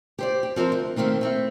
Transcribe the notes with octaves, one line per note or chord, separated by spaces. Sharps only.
G4 C5 D5
G4
F3 C4 D#4 A#4
D2
D#3 A3 A#3 C4 D#4
A3 C4 E4